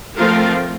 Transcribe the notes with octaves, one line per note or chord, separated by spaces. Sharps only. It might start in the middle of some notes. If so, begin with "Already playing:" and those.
F3 A3 C4 F4 A#4